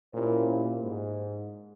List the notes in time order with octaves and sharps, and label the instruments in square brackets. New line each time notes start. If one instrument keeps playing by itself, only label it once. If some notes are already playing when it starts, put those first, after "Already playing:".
[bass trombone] A#2 [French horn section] A#3 C#4 E4 G4 C5
[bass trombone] A#2
G#2